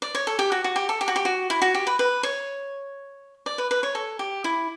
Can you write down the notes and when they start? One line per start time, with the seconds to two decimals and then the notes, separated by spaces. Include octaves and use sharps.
0.02 D5
0.15 C#5
0.27 A4
0.39 G4
0.52 F#4
0.64 F#4
0.76 G4
0.89 A4
1.01 G4
1.08 F#4
1.16 G4
1.25 F#4
1.50 E4
1.62 F#4
1.75 G4
1.87 B4
1.99 B4
2.23 C#5
3.46 D5
3.58 B4
3.71 B4
3.83 C#5
3.95 A4
4.19 G4
4.44 E4